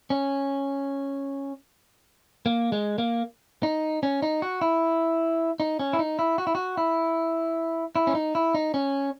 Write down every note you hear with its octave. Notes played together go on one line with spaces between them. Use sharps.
C#4
A#3
G#3
A#3
D#4
C#4
D#4
F#4
E4
D#4
C#4
E4
D#4
E4
F#4
E4
F#4
E4
E4
C#4
D#4
E4
D#4
C#4